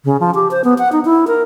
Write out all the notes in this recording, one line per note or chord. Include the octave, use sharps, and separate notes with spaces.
C#3
F3
G4
C5
B3
F#5
D#4
E4
A#4